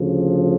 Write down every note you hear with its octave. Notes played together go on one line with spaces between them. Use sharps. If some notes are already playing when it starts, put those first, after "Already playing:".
Already playing: D2 C#3 F3